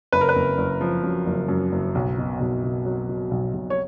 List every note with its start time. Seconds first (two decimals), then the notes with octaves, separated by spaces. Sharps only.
0.12 F#1 B4
0.21 A#4
0.29 B4
0.36 F#1
0.58 F#1
0.81 F3
1.04 F#2
1.26 F#1
1.49 F#2
1.72 F#1
1.95 B1
2.18 B2
2.40 B1
2.64 B2
2.86 F#3
3.09 B2
3.31 B1
3.54 B1
3.70 C#5